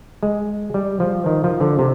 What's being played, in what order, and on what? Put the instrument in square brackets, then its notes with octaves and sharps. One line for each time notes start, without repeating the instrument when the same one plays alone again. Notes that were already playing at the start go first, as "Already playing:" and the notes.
[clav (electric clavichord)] G#3
G3
F3
D#3
F3
D3
C3